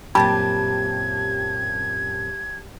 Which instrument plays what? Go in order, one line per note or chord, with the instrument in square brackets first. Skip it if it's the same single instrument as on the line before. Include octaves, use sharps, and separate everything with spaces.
[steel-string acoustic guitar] F#2 A#2 C4 [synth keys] G4 A5 [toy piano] B5 [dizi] G#6